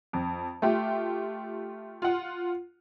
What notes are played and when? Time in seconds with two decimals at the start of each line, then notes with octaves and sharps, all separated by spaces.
0.13 F2
0.62 A3 F4 G4
2.02 F4 F#5